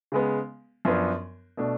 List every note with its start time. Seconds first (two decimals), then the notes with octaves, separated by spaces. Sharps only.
0.12 C#3 G#3 B3
0.85 F#2 F3 B3 D4
1.57 B2 A3 D4